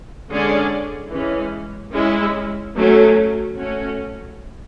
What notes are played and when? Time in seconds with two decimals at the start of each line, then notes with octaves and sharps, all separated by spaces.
0.29 D3 G#3 C#4 G#4 D5
1.11 E3 G#3 C#4
1.93 G#3 C#4 E4
2.76 F#3 A3 C#4
3.57 A3 C#4 F#4